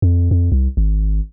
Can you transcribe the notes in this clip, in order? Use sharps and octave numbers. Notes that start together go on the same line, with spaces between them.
F2
F2
C2
G#1